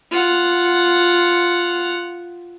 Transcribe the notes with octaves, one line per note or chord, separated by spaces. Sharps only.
F4 F#5